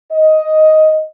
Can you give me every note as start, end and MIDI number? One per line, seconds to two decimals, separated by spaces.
0.12 1.03 75